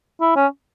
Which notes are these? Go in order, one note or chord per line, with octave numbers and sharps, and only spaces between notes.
E4
C#4